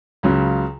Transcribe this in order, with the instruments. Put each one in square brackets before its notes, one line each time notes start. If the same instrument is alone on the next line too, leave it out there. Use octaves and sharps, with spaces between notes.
[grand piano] C#2 C#3 F#3